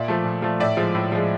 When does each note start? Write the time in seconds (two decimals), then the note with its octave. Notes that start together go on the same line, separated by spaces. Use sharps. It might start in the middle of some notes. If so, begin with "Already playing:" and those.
Already playing: A#2 D5 E5
0.08 F3 A3
0.25 A#2
0.42 F3 A3
0.60 A2 D5 E5
0.77 F3 G#3
0.95 A2
1.12 F3 G#3